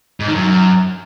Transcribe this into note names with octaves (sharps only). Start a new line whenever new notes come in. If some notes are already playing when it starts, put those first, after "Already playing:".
G#2
D#3
F#2